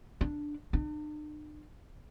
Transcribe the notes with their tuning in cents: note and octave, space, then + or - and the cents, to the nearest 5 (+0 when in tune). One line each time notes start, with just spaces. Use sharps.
D4 +5
D4 +45